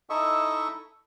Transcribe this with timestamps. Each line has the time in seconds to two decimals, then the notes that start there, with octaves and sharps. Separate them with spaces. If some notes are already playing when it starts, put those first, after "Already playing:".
0.10 D#4 E4 A4 D#5 E5 C#6